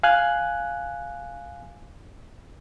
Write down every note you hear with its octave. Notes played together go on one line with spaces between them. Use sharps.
F5 G#5 F#6